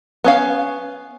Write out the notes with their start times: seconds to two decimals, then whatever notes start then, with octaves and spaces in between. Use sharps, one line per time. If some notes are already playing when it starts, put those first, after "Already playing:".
0.24 B3 C#4 F5